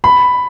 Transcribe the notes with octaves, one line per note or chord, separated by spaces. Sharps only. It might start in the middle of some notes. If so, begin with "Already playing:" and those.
B5